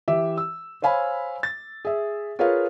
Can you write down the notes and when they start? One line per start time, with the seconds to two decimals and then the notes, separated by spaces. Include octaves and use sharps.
0.08 E3 G4 E5
0.37 E6
0.82 C5 C#5 F5 G#5 B5
1.43 A6
1.85 G#4 E5
2.39 F4 G#4 A#4 B4 C#5 F5